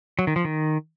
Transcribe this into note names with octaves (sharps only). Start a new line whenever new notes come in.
F#3
D#3
F3
D#3